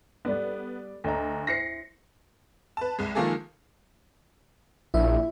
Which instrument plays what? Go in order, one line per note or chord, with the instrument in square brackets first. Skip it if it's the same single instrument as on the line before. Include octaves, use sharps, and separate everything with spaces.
[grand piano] G3 A4 D5 [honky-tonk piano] B3
[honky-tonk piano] D2 [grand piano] A4 D#5 A#5
[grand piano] E4 C5 [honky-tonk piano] A#6 C7 C#7
[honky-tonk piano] B4 A5
C2 G#3
D#3 F3 G#3 A#3 G#4 A4
[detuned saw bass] A#1 [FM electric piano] E4 E5